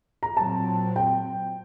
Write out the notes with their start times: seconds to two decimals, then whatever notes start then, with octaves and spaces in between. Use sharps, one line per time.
0.23 A#5
0.37 A#2 F#3 C4 A5
0.96 G5